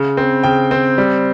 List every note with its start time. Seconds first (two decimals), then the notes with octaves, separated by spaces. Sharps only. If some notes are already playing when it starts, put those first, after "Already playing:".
Already playing: C#3
0.17 C4
0.43 C#3 G5
0.71 C4
0.98 G3